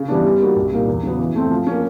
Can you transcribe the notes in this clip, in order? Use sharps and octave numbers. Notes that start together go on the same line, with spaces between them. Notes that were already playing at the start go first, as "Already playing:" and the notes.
Already playing: C#3
E3 G3 B3 D4
G3
A#3 D#4 F#4
C2
A#2 G3 A#3 D#4
E2
C#3 F#3 B3
E3
A3 C4
F3
A#3 C#4